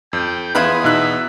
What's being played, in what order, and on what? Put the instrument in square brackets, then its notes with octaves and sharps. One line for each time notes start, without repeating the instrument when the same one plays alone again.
[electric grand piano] F2 [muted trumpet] G5
[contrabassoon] E2 [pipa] E4 F4 B4 [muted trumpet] G#4
[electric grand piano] B2 D#4 F#6 [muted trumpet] E5